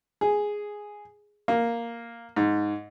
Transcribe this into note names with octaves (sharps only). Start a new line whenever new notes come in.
G#4
A#3
G#2